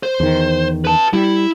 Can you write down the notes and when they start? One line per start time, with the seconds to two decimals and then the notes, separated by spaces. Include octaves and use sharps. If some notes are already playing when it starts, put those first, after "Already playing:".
0.03 C5
0.20 E2 D#3
0.85 B4 A5
1.13 G3 E4